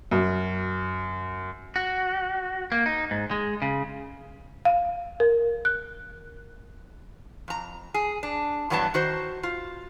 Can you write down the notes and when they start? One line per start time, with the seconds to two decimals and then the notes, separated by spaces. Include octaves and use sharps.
0.11 F#2
1.76 F#4
2.72 A#3
2.86 D#4
3.11 G#2
3.31 G#3
3.62 C#3
4.65 F5
5.20 A#4
5.65 F#6
7.48 F2 A#5
7.94 G#4
8.23 D4
8.70 G2 E3 F#3 B3 D4 A5
8.94 D#3 F#4 C5
9.43 F4